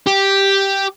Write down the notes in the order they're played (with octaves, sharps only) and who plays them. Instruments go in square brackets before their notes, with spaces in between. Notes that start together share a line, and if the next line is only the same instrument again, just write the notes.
[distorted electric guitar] G4